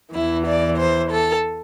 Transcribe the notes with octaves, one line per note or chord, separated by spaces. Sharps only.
E2 E3 E4
D5
C5
A4